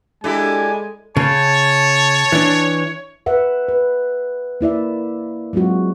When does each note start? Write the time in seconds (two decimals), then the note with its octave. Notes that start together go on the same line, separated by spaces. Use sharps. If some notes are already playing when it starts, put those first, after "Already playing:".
0.24 G#3 D4 E4 G4 A4 G#5
1.17 C#3 C#5 A5
2.32 E3 D4
3.26 B4 E5 F#5
3.68 B4
4.61 A#3 E4 D5 E5
5.53 F#3 G#3 C4 F4 F#4